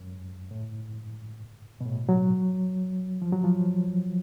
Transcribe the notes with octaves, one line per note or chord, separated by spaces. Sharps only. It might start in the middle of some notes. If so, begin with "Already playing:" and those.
Already playing: F#2
A2
B2
A2
F#3
F3
F#3
F3